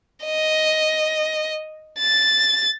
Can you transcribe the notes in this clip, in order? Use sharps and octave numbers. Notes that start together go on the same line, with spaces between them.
D#5
A6